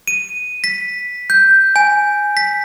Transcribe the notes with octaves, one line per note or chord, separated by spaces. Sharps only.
D#7
B6
G6
G#5
B6